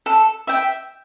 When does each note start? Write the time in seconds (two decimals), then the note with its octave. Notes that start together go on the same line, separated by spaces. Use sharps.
0.06 A4
0.47 E5 G5